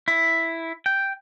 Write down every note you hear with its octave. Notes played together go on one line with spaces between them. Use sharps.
E4
G5